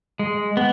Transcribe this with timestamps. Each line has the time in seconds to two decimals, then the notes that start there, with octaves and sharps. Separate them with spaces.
0.19 G#3
0.57 B3